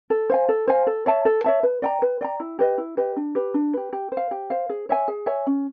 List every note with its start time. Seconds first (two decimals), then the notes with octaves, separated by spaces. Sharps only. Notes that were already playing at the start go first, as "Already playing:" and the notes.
0.10 A4
0.30 C5 F5 G#5
0.49 A4
0.68 C5 F5 G#5
0.87 A4
1.06 C#5 E5 A5
1.25 A4
1.44 C#5 E5 A5
1.63 B4
1.82 D5 G5 A#5
2.02 B4
2.21 D5 G5 A#5
2.40 E4
2.59 G4 B4 D#5
2.78 E4
2.97 G4 B4 D#5
3.16 D4
3.35 G4 B4
3.54 D4
3.73 G4 B4
3.93 G4
4.12 C5
4.17 F5
4.31 G4
4.50 C5 F5
4.70 G#4
4.89 C#5 E5 G#5
5.08 G#4
5.26 C#5 E5 G#5
5.47 C#4